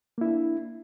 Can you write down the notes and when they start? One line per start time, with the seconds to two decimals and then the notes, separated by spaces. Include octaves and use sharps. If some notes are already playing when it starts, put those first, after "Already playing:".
0.18 A#3
0.21 E4
0.25 D4